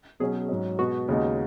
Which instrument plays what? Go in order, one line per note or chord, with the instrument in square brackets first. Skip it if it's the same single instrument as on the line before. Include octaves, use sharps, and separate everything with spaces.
[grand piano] B2 F#3 C#4 [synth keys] G#4
[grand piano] G#2 F#3 C#4
[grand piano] B2 G#3 B3 [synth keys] F#4
[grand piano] D#2 C#3 G#3 B3 D#4